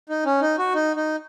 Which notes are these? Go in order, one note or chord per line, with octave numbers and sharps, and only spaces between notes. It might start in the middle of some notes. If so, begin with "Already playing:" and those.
D#4
C#4
D#4
F#4
D#4
D#4